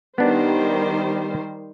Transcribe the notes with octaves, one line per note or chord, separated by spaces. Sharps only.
D#3 G3 B3 D4 C5